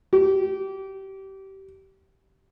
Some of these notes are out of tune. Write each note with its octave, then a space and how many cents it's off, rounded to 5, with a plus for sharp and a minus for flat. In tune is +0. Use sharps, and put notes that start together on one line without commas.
G4 -25